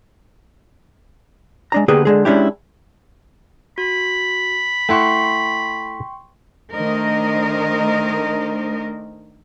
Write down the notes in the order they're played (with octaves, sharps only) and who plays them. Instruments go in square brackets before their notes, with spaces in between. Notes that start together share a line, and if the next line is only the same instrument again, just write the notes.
[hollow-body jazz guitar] G#3 D4 A#5
D3 A#3 B3 G4 G#4 B4
D3 G#3 G#4
G#3 C#4 D4 E4 G4
[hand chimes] F#4 [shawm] B5
[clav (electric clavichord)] A3 E4 F#5 [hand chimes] G5 C6 C#6
[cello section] D#3 A3 D4 A#4 C5 D#5